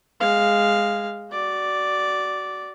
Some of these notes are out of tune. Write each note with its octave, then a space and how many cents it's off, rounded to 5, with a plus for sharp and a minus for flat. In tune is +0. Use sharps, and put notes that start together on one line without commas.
G#3 -10 F5 +0
F#4 +20 D5 -5